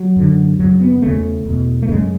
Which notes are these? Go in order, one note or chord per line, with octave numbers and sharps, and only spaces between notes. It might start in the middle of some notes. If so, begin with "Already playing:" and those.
Already playing: F#3
F#2 D3
F#2 C#3 F#3
B3
E2 C#3 A3
E2 B2
A3
F#2 C#3 G#3